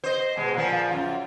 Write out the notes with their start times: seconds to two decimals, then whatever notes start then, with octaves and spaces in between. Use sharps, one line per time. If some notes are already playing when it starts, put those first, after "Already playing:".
0.04 C5 D#5
0.37 B2 G#3
0.54 A#2 F3
0.91 F#2 F4